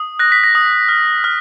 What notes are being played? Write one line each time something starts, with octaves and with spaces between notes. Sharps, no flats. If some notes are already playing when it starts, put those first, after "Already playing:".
Already playing: D#6
F#6 A#6
B6
A#6
D#6
F6
F6